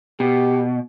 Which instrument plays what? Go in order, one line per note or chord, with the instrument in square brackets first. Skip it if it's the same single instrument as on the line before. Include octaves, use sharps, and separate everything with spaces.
[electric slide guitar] B2 [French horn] G4